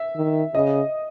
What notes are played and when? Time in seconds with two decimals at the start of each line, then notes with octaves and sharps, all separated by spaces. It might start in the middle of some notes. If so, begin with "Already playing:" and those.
Already playing: E5
0.16 D#3
0.55 C#3 D#5